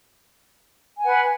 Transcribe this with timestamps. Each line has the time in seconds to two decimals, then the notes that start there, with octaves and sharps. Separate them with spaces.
0.99 G#5
1.02 F#5
1.06 B4